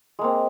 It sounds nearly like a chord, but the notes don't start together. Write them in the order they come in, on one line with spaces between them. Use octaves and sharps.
G#3 A#3 C4